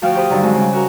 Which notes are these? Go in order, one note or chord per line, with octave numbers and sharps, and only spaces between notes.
D2 F3 F#4 F5 G5 F6
G4 C5 B5 D#6
G2 D3 D#3 F#3
F#3 G#3 C4
C#3 G3 C#4
F#4 A#4